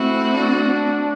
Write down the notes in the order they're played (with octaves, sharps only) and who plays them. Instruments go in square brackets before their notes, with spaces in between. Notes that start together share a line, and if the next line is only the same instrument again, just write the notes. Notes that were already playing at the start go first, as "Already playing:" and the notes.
Already playing: [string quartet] A3 C4 F#4 [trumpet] E4
[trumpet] D4